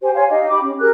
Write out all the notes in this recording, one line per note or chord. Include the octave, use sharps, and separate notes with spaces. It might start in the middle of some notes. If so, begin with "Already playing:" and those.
G4 C5 G#5
C#5 F5 G#5 C6
D#4 G4 D#5 F5
G4 B5 D6
C#4
G4 G#4 A#4 F#6